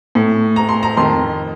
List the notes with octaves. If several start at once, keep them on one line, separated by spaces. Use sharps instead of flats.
A2
A#5
C6
A#5
F2 D#3 C6